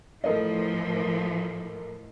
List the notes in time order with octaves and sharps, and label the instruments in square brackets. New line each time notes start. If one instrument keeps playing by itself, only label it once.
[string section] A2 E3 F3 [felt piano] A4 A#4 D#5